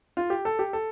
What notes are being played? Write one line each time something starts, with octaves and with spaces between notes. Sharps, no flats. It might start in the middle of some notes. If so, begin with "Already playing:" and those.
F4
G4
A4
G4
A4